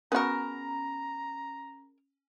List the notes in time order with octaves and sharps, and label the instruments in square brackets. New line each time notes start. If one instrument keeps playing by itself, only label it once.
[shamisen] B3 F#4 [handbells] C#4 B5 [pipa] G#4 A#4 [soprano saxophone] A#5